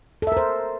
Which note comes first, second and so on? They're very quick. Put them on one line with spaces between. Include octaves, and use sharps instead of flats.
A4 E5 A#4 C5